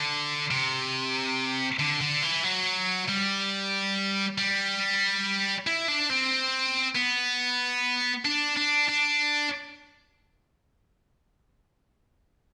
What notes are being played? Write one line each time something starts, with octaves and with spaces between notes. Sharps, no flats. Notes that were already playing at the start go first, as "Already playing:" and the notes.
Already playing: D3
C3
D3
D3
E3
F#3
G3
G3
E4
D4
C4
B3
D4
D4
D4